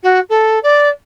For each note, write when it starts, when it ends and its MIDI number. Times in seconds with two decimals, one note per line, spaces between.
0.03 0.20 66
0.29 0.59 69
0.63 0.88 74